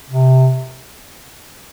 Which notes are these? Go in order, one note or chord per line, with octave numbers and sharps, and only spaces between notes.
C3